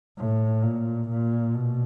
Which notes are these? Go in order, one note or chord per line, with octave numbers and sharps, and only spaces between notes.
A2
A#2
A#2
B2